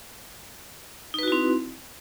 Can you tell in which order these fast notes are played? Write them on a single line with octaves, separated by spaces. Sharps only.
D#4 B4 F#4 E4 C4